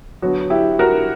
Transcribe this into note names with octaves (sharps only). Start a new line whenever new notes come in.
D3 F#3 B3 F#4
E4 G4
F#4 A#4